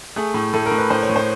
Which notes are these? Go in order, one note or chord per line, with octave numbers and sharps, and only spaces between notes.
A3 G#4
A2
A2 A4
A#4
A2
B4
A2 C5
C#5
A2
C5